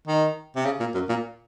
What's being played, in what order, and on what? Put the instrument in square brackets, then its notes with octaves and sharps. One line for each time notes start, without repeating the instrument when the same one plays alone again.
[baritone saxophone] D#3
C3
C#3
A#2
F#2
A#2